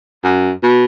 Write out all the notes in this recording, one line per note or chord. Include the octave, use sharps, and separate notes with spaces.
F#2
B2